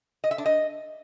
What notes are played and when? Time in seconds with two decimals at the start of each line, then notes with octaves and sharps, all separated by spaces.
0.24 D#5
0.31 E5
0.38 D4
0.46 D#5